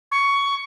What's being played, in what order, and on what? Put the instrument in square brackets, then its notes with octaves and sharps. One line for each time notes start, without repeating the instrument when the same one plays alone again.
[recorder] C#6